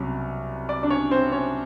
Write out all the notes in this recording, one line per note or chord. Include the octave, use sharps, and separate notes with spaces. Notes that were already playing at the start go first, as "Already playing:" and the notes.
Already playing: C2 B2 F#3 C#4
D5
D4 D5
C#4 C#5
C4 C5
C#4 C#5